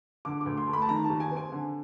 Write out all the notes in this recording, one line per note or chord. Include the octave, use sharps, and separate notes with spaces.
D3 D6
D2 D6
C6
A3
B5
A5
D#3 A#5
A5
D#2
G#5
C4
G#5
D3